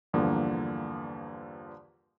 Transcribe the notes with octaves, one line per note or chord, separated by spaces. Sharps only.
E2 G2 D3 F3 A#3